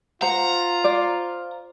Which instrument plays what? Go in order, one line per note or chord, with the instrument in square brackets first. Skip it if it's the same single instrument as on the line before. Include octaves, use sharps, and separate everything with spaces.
[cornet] F4 [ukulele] C5 F#5 [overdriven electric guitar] A#5
[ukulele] C5 D5